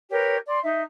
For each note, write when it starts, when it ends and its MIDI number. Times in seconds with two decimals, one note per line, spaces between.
0.11 0.37 67
0.11 0.37 70
0.11 0.37 71
0.11 0.37 73
0.47 0.59 74
0.47 0.59 84
0.63 0.82 63
0.63 0.82 76